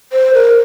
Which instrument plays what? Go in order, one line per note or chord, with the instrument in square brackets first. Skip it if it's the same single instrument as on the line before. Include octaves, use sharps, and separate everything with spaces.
[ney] C5
A#4